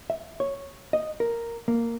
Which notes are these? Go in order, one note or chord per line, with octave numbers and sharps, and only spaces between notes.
E5
C#5
D#5
A#4
A#3